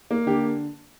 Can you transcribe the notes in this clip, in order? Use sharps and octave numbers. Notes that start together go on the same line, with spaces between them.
A#3
D3 G4